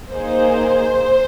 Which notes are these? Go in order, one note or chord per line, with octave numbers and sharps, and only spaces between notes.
A#3 D#4 G#4 C5